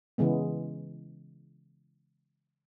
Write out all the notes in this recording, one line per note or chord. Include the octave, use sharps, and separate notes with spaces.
C#3 E3 G#3 B3